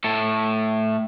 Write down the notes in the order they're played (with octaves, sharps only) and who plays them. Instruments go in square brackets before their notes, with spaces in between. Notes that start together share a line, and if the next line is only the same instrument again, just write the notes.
[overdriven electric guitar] A2 A4